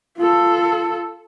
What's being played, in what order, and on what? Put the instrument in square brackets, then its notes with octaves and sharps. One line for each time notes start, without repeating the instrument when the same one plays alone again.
[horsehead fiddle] F4 A4